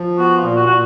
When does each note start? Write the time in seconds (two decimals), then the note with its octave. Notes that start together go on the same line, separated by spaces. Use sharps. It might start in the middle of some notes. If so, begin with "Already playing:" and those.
Already playing: F3
0.18 B3 F#4
0.37 F4
0.43 A#2
0.56 F#4
0.66 A#2 F#4